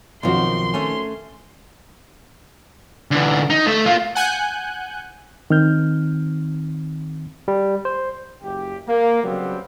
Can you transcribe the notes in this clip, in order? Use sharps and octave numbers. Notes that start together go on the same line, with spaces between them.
B1 D#3 F3 C4 F#4 C6
A3 C#4
D3 E3
D#4
A3 E5
A#3 F4
F#5 G#5 F#6 G6
D#3 C4 F6 G6
G3
C5
F#1 G4
A#3
C#3 F#3 G3 B3 C4